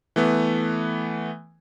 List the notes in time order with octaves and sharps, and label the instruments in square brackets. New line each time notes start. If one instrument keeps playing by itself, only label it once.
[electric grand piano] E3 A3 B3